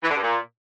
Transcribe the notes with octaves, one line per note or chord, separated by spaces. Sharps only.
E3
D3
G2
A#2